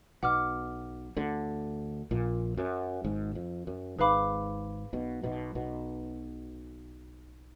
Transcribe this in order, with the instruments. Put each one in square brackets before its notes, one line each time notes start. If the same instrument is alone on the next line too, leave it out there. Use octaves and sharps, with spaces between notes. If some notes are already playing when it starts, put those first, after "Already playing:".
[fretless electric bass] B1 B2 [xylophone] F#5 D6 F6
[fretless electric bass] D2 D3
A#1 A#2
F#2
G#1 G#2
F2
F#2
[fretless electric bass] G#1 G#2 [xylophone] G#4 B4 F5 B5 D6
[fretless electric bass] B1 B2
B1 B2
B1 B2